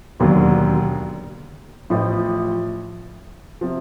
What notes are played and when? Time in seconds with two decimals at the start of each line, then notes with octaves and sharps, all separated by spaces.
0.20 E1 D#2 D3 F#3
1.90 A1 A2 F3
3.61 C3 F3